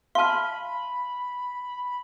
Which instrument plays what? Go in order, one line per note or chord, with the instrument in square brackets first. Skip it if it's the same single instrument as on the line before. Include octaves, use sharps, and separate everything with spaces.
[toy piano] F5 A5 [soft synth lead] B5 [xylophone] C6 F6